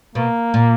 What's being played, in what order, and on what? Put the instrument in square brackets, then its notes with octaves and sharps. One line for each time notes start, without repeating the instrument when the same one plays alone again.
[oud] B2 [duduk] A#3
[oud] A#2